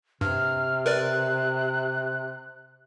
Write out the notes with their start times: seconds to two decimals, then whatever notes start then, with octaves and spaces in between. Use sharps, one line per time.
0.21 G2 C3 F6
0.86 A#4 B4 D5 F#6